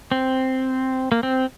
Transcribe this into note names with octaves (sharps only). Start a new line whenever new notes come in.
C4
A#3
C4